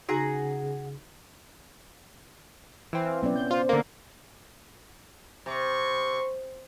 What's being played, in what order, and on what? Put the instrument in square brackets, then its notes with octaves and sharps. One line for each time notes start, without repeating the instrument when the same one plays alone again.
[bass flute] C#3 [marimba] D#4 F#4 [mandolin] G#4 F#5 A#5
[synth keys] E3 C4
[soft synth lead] F5
[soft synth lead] F#3 [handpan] B3 C#4 D5
[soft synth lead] G6
[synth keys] F4 [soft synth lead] C5
[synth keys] D3 A#3
[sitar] C3 [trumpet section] C6 C#6